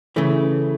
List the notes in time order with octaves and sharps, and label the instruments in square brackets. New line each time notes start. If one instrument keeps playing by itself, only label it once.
[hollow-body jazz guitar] C#3 E3 A3